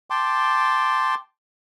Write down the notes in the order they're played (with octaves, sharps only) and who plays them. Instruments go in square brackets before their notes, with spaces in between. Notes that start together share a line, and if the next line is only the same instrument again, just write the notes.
[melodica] G5 A5 C6 D6